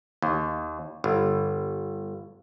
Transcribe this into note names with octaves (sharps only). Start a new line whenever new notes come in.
D#2
G1